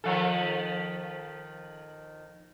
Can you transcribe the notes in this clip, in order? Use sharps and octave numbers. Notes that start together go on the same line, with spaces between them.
D#3 F3 A4